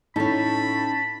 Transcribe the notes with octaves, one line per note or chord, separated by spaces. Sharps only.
A2 C#4 D#4 A5 B5